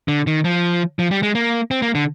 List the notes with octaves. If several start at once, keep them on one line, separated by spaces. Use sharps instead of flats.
D3
D#3
F3
F3
G3
G#3
A#3
C4
A#3
D3